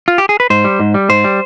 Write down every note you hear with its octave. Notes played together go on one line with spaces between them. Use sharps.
F4
G4
G#4
B4
G#2 C5
G3
G#2
G3
G#2 C5
G3